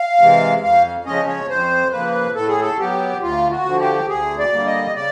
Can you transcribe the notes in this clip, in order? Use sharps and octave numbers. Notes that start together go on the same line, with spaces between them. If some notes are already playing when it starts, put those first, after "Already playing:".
Already playing: F5
C3 E3 G#3
F2 F5
C#3 F3 G#3 C#4 D#5
C#5
F2 C5
C#3 F3 A#3 B4
A2 A4
G#4
A4
F#3 B3 G4
D2 F4
F#4
D3 F3
G4
D2 G#4
D5
D3 G3 A#3
D#5
C#3 D5